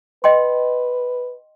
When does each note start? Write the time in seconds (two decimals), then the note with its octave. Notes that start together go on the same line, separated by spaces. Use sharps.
0.24 B4 D#5 G5 C6